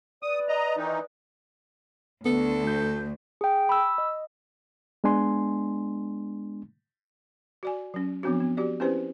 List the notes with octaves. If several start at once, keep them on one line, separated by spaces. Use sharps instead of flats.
B4 D5 D#6
D#5 A#5
D#3 E3 D#4
D2 B3 A4
G6
G#4 G5
B5 E6
D#5
G#3 B3 D4 G#5 C6
F#4 D5 G#5
F#3 C#4
F3 B3 C4 D4 F#4
B3
F#4 G4 D5
C4 C#4 E4 G4 B4 C5